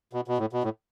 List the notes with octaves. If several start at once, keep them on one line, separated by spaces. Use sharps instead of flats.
B2
B2
A2
B2
A2